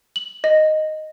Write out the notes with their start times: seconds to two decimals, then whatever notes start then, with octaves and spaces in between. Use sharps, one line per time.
0.16 F#7
0.44 D#5